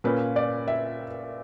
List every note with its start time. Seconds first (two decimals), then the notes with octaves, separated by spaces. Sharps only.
0.04 A#2 A#3 C#4 B4
0.36 D5
0.68 E5